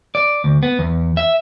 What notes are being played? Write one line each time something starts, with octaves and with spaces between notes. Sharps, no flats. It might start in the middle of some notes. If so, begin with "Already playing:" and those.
D5
D2
B3
E2
E5